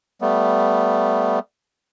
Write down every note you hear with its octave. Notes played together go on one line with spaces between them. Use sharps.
G3 A3 B3